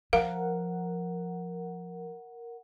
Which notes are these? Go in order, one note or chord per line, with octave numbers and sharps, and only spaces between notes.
F3 A#4 F5 F#5